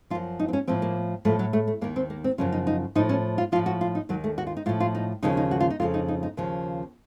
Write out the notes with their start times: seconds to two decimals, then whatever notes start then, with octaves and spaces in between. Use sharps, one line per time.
0.10 F3 F4
0.15 F#2
0.39 D#4
0.48 C4
0.53 C#4
0.67 A2 F3 C4
0.82 A#3
1.25 A2 F3 A3
1.39 F#3
1.53 A3
1.67 A3
1.81 D#2 D#3 A#3
1.96 C4
2.10 A#3
2.24 C4
2.38 F#2 C#3 F3 C#4
2.52 D#4
2.67 D#4
2.95 A2 F3 D#4
3.09 C#4
3.38 F4
3.52 F3 F4
3.56 A2
3.66 F#4
3.81 F4
3.95 D#4
4.09 D#2 D#3 F#3
4.24 A3
4.38 F#4
4.47 F4
4.57 D#4
4.66 A2 F4
4.69 F3
4.80 F4
4.95 D#4
5.22 D#2 C#3 F3 D#4
5.37 D#4
5.51 F#4
5.60 F4
5.70 D#4
5.80 F2 C#3 F3 F4
5.94 D#4
6.08 D#4
6.23 D#4
6.37 D#2 C#3 F3